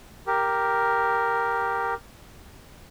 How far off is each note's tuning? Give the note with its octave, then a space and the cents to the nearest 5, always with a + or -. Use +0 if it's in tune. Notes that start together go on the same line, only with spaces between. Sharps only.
G4 +0 A#4 +0